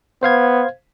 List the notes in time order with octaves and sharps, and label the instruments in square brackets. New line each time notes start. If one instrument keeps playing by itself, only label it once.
[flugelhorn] B3 [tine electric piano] C5 F5 G#6